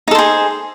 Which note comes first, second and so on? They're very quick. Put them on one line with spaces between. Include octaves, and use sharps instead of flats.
D#4 A4 C5 G#4